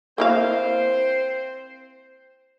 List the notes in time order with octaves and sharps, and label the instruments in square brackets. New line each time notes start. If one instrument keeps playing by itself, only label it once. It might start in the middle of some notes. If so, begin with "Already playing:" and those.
[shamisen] A#3 E4 F5 [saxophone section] C4 C5